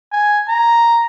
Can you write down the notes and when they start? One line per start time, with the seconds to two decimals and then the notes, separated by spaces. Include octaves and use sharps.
0.13 G#5
0.49 A#5